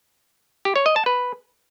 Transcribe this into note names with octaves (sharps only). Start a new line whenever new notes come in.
G4
C#5
D#5
A5
B4